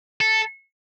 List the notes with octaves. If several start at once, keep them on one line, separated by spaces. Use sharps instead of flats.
A4